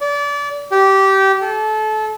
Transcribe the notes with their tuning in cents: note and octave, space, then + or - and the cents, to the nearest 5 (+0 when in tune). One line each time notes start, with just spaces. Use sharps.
D5 -30
G4 -20
A4 -30